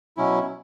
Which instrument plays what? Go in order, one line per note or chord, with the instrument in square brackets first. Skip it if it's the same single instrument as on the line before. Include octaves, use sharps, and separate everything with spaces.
[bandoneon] B2 F#3 C#4 E4